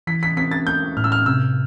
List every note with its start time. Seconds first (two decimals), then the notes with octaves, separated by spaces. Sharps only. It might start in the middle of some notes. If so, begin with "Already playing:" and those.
0.07 E3 B6
0.23 B6
0.37 C4 B6
0.51 A6
0.67 A3 G6
0.97 A2 F6
1.04 E6
1.12 F6
1.26 C3 E6